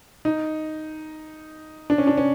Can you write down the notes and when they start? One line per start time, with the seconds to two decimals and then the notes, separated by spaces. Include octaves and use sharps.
0.25 D#4
1.90 D4
1.98 C#4
2.07 D4
2.17 C#4